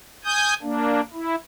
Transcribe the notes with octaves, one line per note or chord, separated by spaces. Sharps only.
G#5 D#6 G6
A#3 D4
E4